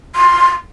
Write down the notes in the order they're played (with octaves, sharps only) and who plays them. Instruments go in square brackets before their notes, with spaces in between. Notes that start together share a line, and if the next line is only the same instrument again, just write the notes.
[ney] C6